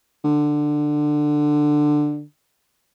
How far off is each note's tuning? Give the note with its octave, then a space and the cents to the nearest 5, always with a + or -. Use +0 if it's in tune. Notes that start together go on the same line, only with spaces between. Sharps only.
D3 +15